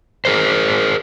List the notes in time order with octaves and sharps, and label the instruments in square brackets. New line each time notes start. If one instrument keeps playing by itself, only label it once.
[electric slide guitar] G#4 A#4 C5